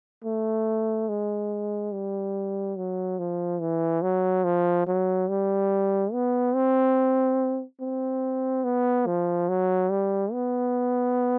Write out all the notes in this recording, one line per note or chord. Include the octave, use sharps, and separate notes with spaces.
A3
G#3
G3
F#3
F3
E3
F#3
F3
F#3
G3
B3
C4
C4
B3
F3
F#3
G3
B3